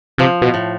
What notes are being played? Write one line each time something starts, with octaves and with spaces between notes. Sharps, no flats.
C3 F3
B2
A2